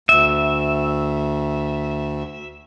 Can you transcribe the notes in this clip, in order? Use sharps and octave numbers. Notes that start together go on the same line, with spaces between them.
D2 E5